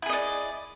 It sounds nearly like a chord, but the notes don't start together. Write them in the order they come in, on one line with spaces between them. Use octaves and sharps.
E4 G#4 D#5 D5